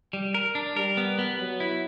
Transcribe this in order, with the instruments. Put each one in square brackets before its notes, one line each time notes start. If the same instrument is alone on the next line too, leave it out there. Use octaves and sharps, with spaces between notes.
[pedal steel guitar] G3
A#4
D4
[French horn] G3 [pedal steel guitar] A#4
[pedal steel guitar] B3
B3
[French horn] F#3 [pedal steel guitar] B3
[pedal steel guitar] E4